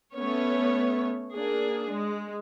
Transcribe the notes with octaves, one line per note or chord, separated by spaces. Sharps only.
A3 B3 C#4 C#5
A#3 D4 G#4
G#3